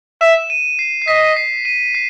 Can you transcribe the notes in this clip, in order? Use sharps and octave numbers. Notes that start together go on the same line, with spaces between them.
E5 E7
D#7
C7
C7
D#5 B6
C7
D#7
C7